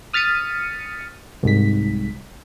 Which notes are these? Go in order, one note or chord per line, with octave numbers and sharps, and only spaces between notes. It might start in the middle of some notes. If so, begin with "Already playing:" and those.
D#6 F6 A6 B6 C#7 D#7
C2 G#2 B6